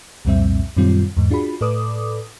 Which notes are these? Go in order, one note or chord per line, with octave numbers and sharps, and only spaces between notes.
C2 F2 A#2 G3 C4 E5
F#2 A#2 D#3 G3 C4 F4
E2 G#2
D4 F4 F#4 G#4 B5
A2 A4 B4 D5 D6 D#6